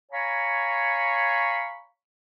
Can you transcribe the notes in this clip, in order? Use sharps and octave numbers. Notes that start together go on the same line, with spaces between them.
C#5 F5 G#5 A#5 B5 C#6